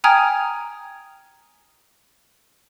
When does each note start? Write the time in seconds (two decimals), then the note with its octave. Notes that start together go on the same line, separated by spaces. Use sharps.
0.04 G5 G#5 A#5 D#6 F6 G#6